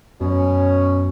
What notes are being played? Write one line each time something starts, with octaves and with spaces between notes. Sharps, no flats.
F#2 B2 F#3 C#4